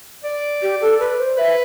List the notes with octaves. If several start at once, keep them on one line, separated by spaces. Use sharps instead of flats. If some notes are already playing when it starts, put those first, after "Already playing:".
D5
G4
A4
B4
C5
B4 E5